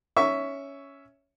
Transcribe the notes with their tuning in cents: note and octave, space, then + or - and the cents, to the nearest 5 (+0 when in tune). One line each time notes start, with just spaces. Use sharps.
C#4 +5 E5 +0 C#6 +10